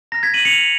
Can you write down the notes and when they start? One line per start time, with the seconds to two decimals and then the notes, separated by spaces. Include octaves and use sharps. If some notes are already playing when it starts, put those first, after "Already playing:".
0.12 A#5 F6 A#6
0.23 G#6 B6
0.34 D#7 F#7
0.45 C#7 F7